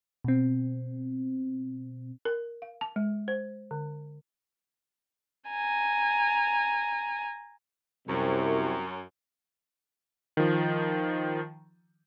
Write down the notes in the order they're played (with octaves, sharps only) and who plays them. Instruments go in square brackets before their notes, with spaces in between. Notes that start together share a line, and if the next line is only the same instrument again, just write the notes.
[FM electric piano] B2 C4
[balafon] A#4
F5
A5
G#3
C5
D3
[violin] G#5 A#5
[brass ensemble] C2 C3 [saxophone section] F#2
[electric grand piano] D#3 F3